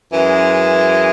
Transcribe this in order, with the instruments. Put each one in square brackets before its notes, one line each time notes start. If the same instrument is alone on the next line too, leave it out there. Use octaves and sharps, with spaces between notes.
[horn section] F#2 E3 G#3